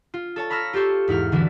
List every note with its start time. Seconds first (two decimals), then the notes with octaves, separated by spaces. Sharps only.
0.14 F4
0.36 A4 C#5 A5
0.50 A#5 B5 C#6 E6 F6 A#6
0.73 F4 G4 A4 C5 C#6
1.08 E2 G#2 E4 F6
1.32 D3 E3 F#3 D4 E4